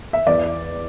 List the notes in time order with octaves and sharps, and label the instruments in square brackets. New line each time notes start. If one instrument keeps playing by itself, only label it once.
[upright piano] E5
E2 D5